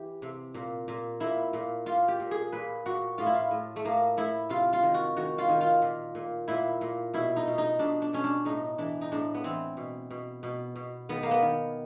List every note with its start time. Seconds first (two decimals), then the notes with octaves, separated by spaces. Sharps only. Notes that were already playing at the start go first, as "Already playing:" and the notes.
Already playing: E3 G4
0.22 C3
0.54 A#2
0.88 A#2
1.20 A#2 E4
1.53 A#2
1.86 A#2 F4
2.08 G4
2.20 A#2
2.31 G#4
2.52 A#2 B4
2.86 A#2 F#4
3.18 A2 F4
3.26 E4
3.34 F4
3.51 A2
3.76 A3
3.85 A2 A#3
4.17 A2 E4
4.49 C3 F4
4.73 F4
4.83 D#3
4.94 F#4
5.16 D#3 F#4
5.38 F4
5.49 D#3
5.61 F4
5.82 A#2
6.15 A#2
6.48 A#2 E4
6.81 A#2
7.14 B2 E4
7.36 D#4
7.47 B2
7.58 D#4
7.79 B2 D4
8.02 D4
8.13 B2 C#4
8.24 D4
8.45 A2 D#4
8.78 E3 D4
9.01 D#4
9.12 A2 D4
9.35 B3
9.44 E3 C4
9.77 B2
10.10 B2
10.43 B2
10.76 B2
11.09 D#3 B3
11.23 A#3
11.31 B3
11.42 D#3